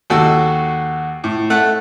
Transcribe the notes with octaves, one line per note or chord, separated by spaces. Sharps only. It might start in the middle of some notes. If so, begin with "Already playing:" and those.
D#2 F#4 A4 E6
A2
A3 F#5 F#6